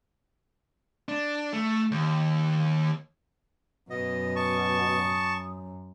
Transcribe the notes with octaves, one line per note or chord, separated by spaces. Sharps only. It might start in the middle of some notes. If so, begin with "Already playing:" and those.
D4
A3
D#2
F#2 B2 D#5
A5 C#6 D#6